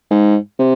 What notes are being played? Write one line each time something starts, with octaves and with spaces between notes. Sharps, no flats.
G#2
C3